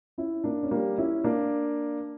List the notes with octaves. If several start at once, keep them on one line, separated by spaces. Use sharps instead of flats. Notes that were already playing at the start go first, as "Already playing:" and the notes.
C#4 E4
A#3 D4
C#4
G3 A#3
C#4 E4
A#3 D4